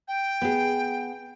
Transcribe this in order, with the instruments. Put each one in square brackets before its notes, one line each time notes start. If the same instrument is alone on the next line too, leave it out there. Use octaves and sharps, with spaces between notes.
[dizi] G5
[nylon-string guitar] B3 G#4